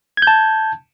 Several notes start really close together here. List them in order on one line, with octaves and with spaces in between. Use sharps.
G#6 G6 A5